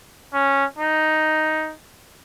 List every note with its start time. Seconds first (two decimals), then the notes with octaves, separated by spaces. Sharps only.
0.34 C#4
0.79 D#4